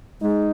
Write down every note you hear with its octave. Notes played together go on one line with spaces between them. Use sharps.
G#3 D#4